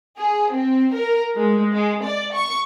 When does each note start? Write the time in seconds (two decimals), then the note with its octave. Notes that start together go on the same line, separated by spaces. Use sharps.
0.16 G#4
0.52 C4
0.93 A#4
1.35 G#3
1.73 G#3
2.04 D5
2.34 C#6